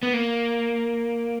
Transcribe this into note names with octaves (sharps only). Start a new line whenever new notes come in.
B3
A#3